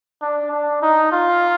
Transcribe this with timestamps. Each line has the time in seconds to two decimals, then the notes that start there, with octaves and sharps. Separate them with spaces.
0.22 D4
0.51 D4
0.82 D#4
1.12 F4